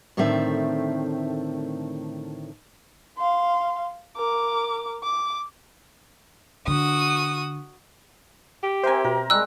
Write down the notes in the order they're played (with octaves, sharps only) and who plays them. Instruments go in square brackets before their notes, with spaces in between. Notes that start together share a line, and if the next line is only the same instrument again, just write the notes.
[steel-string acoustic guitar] A2 D3 D#3 A3 C4 E5
[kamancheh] F5 C6
A#4 D6
D6
[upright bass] D3 [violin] F#4 D#6
[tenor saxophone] G4
[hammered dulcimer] C4 A#4 E5 [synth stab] C5 G#5
[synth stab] B2 [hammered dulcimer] A#4
[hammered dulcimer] G3 G#3 [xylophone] E6 F#6